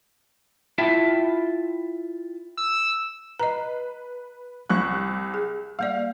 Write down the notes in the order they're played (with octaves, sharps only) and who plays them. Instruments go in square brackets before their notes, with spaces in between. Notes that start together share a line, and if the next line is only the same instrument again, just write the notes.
[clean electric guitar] E4 F4 E5 G5 A5
[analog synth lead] E6
[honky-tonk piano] B4 [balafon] D#5 A#5
[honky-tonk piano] C2 C#6 F#6
[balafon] G#4
[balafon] G3 A#3 D5 [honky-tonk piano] F5